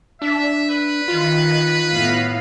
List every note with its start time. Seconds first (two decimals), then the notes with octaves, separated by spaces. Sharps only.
0.22 D4 E5
0.70 B4
1.08 D#3 F4
1.91 A2 B3 F5